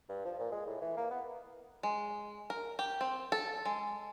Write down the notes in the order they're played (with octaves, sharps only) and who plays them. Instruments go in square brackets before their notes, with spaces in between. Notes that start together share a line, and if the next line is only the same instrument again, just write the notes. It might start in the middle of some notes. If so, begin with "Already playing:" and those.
[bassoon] G2
F3
A#2
G#3
A2
E3
A#3
B3
[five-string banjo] G#3
A#4
G4
C4
A4
G#3